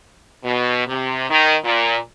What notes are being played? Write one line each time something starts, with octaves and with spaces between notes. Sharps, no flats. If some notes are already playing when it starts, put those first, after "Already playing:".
B2
C3
D#3
A#2